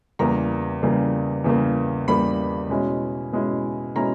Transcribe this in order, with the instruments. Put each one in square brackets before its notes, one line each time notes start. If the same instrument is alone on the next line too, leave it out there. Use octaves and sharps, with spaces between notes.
[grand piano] E2 C#3 G3 A#3 A#5
E2 C#3 G3 A#3
E2 C#3 G3 A#3
E2 C#3 G3 A#3 B5
B2 G#3 C#4 E4
B2 G#3 C#4 E4
B2 G#3 C#4 E4 A#5